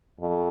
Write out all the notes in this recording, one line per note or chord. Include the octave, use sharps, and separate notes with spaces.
F2